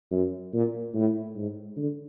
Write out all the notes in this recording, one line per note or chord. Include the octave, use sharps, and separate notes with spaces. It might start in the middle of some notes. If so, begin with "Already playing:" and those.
F#2
A#2
A2
G#2
D3